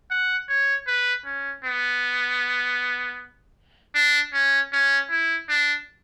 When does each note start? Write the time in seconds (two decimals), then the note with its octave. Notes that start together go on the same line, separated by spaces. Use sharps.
0.11 F#5
0.49 C#5
0.87 B4
1.25 C#4
1.65 B3
3.95 D4
4.33 C#4
4.73 C#4
5.10 E4
5.49 D4